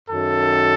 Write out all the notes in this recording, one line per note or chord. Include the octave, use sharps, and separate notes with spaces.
F#2 D#3 F#3 A4